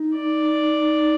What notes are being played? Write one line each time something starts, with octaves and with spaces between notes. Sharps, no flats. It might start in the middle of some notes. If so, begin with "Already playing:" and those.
Already playing: D#4
D5